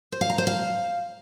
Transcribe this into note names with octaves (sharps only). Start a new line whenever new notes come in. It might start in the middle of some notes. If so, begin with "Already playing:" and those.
C5
F5
A#5
C5
F5